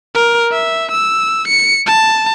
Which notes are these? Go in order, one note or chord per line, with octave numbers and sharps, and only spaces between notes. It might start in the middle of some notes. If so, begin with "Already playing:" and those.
A#4
E5
E6
C#7
A5